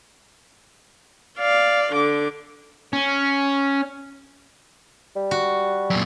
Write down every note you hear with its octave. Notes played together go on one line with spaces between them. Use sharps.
D5 F5
D3 D6
C#4
G3
F#4
F#2 A#2